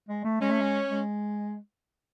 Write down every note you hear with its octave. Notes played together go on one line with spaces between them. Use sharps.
G#3
A3
G#3 C#4
A3
G#3
G#3